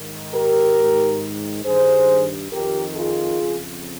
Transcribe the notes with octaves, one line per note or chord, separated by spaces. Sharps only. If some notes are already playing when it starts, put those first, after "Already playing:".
Already playing: G#2 D#3
G4 A#4
G#2 D#3
G2 D#3 G#4 C5
F2 D#3 G4 A#4
F4 G#4
F2 C#3